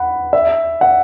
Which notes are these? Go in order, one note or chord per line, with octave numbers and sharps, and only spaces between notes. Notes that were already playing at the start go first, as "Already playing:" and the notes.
Already playing: F#5 B5
E5
F#5